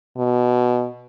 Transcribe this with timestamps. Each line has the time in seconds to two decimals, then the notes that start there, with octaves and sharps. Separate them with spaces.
0.17 B2